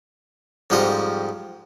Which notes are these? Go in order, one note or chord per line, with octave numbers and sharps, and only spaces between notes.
F2 G#2 F3 G3 D#5